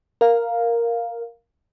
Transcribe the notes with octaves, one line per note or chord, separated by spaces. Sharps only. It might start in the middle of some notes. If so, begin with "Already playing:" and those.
A#4 F5